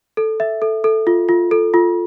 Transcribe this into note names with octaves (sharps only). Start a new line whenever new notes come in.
A4
E5
A4
A4
F4
F4
A4
F4